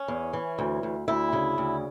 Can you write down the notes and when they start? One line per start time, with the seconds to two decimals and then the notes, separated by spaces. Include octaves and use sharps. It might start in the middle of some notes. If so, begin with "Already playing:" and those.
Already playing: C#4
0.08 E2
0.33 E3
0.59 D2
0.83 D2
1.08 D2 E4
1.33 C#3
1.58 D2